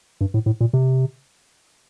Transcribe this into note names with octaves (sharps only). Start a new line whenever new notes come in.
G2
A2
A2
A#2
C3